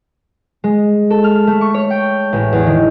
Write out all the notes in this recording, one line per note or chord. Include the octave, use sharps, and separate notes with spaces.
G#3
A4
F6
A3
C#6
C#5
G5
A1
E2
D#3